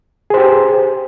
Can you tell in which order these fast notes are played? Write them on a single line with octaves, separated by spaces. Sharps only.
G#4 C5 G4